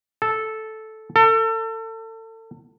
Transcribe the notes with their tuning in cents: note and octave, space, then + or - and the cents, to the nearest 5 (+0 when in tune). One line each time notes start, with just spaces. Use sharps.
A4 -10
A4 +30